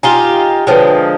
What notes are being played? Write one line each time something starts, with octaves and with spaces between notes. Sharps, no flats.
D#4 F4 G4 G#5 G7
D3 F3 G#3 B4 C#5 G5